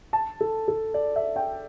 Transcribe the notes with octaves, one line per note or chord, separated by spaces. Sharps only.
A5
A4
A4
D5
E5
G5